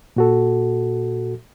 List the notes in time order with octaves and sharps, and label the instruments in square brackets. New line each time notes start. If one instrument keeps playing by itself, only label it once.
[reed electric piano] A#2 F#4 A4